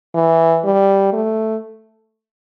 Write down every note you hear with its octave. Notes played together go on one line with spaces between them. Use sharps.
E3
G3
A3